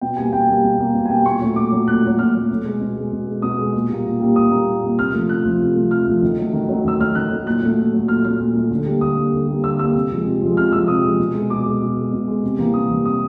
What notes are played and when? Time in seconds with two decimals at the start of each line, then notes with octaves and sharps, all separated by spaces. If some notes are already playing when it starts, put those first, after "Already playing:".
0.01 B2 G5
0.17 G3 A#3 G#5
0.32 B2 G5
0.48 G3 A#3
0.64 B2
0.79 G3 A#3
0.94 B2
1.06 G#5
1.10 G3 A#3 G5
1.26 A#2 C#6
1.41 F#3 A3
1.56 A#2 D6
1.72 F#3 A3
1.87 A#2 F#6
2.03 F#3 A3
2.19 A#2 F6
2.34 F#3
2.39 A3
2.50 B2
2.65 G#3
2.81 B2
2.96 G#3
3.12 B2
3.27 G#3
3.42 B2 D#6
3.58 G#3
3.74 A#2
3.89 G3 A#3
4.06 A#2
4.20 G3 A#3
4.36 A#2 D#6
4.51 G3 A#3
4.67 A#2
4.83 G3 A#3
4.98 C3 F6
5.13 F3 A3
5.29 C3 F#6
5.45 F3 A3
5.61 C3
5.76 F3 A3
5.91 C3 F6
6.07 F3 A3
6.22 D#3
6.38 F#3 A3
6.53 D#3
6.69 F#3 A3
6.85 D#3 E6
7.00 F#3 A3 F6
7.15 D#3 F#6
7.31 F#3 A3
7.46 A#2 F#6
7.62 F#3 A3
7.78 A#2
7.93 F#3 A3
8.08 A#2 F6
8.24 F#3 A3 F6
8.40 A#2
8.55 F#3 A3
8.70 D3
8.86 G3 A#3
9.01 D3 D#6
9.17 G3 A#3
9.33 D3
9.48 G3 A#3
9.64 D3 E6
9.79 G3 A#3 E6
9.95 C3
10.11 F3 G#3
10.26 C3
10.42 F3 G#3
10.57 C3 F6
10.72 G#3 E6
10.76 F3
10.88 C3 D#6
11.03 F3 G#3
11.19 B2
11.34 G#3
11.50 B2 D6
11.66 G#3
11.81 B2
11.97 G#3
12.12 B2
12.27 G#3
12.43 C3
12.59 E3 G3 A#3
12.74 C3 D#6
12.89 E3 G3 A#3
13.05 C3 D#6